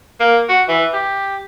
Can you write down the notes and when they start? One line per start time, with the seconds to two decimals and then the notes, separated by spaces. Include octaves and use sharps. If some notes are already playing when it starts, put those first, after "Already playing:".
0.20 A#3
0.49 F#4
0.68 E3
0.94 G4